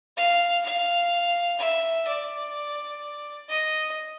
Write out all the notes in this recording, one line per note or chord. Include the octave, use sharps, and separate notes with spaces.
F5
F5
E5
D5
D#5